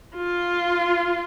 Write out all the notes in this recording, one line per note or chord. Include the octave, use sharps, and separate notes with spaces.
F4